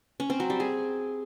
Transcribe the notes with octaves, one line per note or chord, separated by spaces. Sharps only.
C#4
C4
F#3
G3
G#4